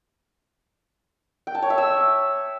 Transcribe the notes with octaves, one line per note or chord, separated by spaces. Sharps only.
G5
A5
C#5
E5
E6